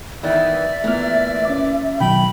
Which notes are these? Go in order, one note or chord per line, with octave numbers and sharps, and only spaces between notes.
D#3 E3 B3 D5 E5
A#2 E3 A3 B3 F6
C#4 D6
B2 D#3 F#3 G5 B5